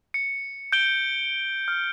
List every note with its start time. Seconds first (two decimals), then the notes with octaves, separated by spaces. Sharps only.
0.14 C#7
0.72 G6 D7 G7
1.68 F6